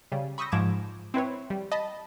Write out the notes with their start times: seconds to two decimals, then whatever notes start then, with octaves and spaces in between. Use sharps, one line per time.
0.12 C#3 G3
0.38 B5 C#6 D#6 E6 G6 A#6
0.52 G#2 F3 D6 G#6 E7
1.14 C4 E4 B4 C#5
1.50 G3
1.72 D#5 A5 B5